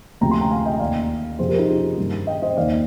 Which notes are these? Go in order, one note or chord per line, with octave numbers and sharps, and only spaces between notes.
D2 C3 F3 G5 A#5
G#5 C6
G5 A#5
F5 G#5
D#5 G5
D#2 D#3 D5 F5
F2 C3 F3 G#4 C5
G4 A#4
D#4 G4
F4 G#4
G2 D#3
D#5 G5
C5 D#5
D#2 D#3 D5 F5